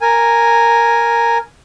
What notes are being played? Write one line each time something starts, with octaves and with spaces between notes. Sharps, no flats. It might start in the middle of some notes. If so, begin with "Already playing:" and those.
A#4 G#5